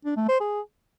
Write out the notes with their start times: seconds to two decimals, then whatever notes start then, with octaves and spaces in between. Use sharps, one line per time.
0.05 D4
0.17 A3
0.29 C5
0.40 G#4